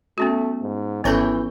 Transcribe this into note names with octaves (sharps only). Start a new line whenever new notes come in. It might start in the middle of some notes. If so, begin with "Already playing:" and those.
A3 B3 C#4 F#4
G#2
G#1 E3 B3 C#4 A4 C#5 G6